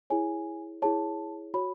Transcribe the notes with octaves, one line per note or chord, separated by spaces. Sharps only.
E4 G#4 C#5 G#5
E4 G#4 C#5 A5
F#4 C#5 B5